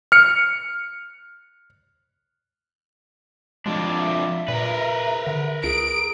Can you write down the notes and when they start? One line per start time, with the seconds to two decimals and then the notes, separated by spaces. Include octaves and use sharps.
0.12 F6 C#7
3.66 F2 G#3 D4
4.00 E5
4.48 A#2 A#4 B4
5.27 D3
5.64 C#2 G#4 D7